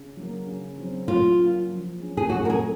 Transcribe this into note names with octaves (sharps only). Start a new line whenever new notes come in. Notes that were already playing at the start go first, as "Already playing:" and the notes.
Already playing: C#3
F#3 A#3
C#3
F#3 C4
F#3 F4
A#3 C#4
F3
G#3 C#4
G#4
F#3 F#4
A#4
G#4
C4